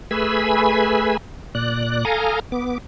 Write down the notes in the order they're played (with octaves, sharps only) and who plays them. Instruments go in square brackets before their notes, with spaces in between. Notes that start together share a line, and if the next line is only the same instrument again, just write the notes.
[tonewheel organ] A3 G#4 B4 G#5 B5 E6
A#2 D5 F#6
A4 F5 G#5 A#5 D#6
B3 D6